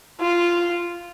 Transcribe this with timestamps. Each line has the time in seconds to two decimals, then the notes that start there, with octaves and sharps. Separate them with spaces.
0.20 F4